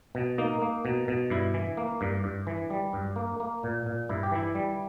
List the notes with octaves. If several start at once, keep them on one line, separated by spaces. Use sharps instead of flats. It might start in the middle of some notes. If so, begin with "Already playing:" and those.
B2
A#3 D#4
A#3
B2
B2
G2 E4
E3
A#3
G2
G2
E3
G3
G2
A#3
A#3
A#2
A#2
G2 E4
G4
E3 E4
G3